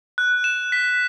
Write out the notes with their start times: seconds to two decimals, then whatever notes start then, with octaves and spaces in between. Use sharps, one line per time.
0.18 F#6
0.44 E7
0.72 B6